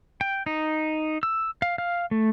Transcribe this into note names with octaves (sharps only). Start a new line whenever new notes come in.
G5
D#4
E6
F5
F5
A3